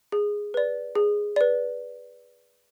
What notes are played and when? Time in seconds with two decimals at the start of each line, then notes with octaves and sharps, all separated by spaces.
0.12 G#4
0.54 B4 D5
0.95 G#4
1.36 B4 D5